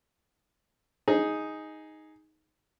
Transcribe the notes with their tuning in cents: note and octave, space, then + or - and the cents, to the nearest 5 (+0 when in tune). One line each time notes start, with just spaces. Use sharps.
D#4 +5 G#4 +0